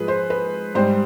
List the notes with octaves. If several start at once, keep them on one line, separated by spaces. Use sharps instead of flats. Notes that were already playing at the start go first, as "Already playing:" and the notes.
Already playing: G#2 F3 G#4 B4
C5
B4
G#2 G3 C5